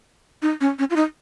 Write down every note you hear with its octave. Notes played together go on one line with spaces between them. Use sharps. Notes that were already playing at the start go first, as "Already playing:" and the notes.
D#4
C#4
C#4
F4
D#4